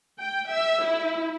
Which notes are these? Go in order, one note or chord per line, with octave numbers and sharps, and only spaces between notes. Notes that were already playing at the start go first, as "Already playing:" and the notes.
G5
E5
E4